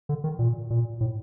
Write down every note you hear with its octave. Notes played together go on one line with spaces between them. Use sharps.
D3
D#3
A#2
A#2
A2